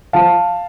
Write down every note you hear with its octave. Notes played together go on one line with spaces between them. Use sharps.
F3 F5 A5